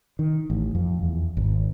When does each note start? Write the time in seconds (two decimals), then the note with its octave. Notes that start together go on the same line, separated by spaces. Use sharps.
0.19 D#3
0.50 A1
0.75 F2
1.03 E2
1.37 G#1